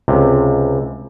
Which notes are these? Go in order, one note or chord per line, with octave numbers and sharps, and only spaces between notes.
C#2 C3